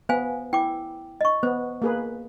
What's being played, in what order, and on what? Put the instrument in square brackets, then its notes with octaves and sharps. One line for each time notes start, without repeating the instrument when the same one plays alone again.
[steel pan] B3 [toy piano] C5 F5 G#5
[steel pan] E4 [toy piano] G5 D6
[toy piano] D#5 C#6
[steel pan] B3 [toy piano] C5
[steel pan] A#3 G#4 B4